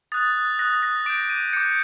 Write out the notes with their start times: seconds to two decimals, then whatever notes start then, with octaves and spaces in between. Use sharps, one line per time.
0.12 D#6 F#6 A6
0.59 D#6 F#6 A#6
0.83 A#6
1.06 D6 G6 D7
1.30 D#7
1.53 D6 G6 C#7